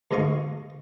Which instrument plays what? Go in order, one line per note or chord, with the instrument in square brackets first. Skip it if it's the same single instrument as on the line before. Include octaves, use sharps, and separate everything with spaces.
[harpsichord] D2 G#2 D#5 F5 C#6